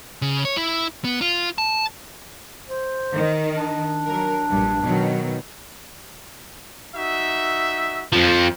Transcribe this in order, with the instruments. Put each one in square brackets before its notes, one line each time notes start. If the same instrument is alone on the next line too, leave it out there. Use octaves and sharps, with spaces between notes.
[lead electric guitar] C#3
C#5
E4
B3
F4
A5
[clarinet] C5
[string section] D#3
[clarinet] D4
[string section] F#3 A#4
A#1 G2
B2 D#3 F#3
[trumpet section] D#4 F#4 E5
[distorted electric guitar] F2 F3